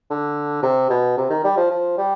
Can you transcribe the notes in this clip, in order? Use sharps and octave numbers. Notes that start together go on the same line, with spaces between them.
D3
C3
B2
C3
D#3
G3
F3
F3
G3